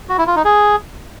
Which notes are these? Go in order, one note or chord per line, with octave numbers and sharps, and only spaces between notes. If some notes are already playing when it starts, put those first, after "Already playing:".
F#4
E4
F4
D#4
G#4